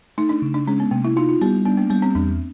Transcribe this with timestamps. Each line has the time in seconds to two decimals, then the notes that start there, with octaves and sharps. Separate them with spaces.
0.18 A3 D#4
0.29 D4
0.42 C#3
0.54 D4
0.67 G#3 C#4
0.80 B3
0.91 C3 A#3
1.04 E4
1.16 D#4 F4
1.29 D#4
1.41 G3 B3
1.65 B3 D4
1.77 A#3
1.90 G3 B3
2.02 C4
2.15 E2 D4